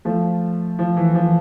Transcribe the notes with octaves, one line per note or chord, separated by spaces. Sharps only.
F3 A3
F3
E3
F3